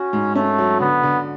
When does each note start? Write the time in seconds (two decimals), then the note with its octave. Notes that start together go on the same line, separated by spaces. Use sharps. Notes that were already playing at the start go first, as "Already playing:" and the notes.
Already playing: C#4 F#4
0.13 G#2
0.35 A3 C#4
0.59 F#3
0.80 D3 B3
1.03 D3